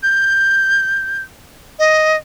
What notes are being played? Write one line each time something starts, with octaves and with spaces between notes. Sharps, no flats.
G6
D#5